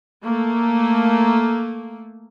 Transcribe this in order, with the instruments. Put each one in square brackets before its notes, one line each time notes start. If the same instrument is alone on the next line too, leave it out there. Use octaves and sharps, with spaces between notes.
[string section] A3 A#3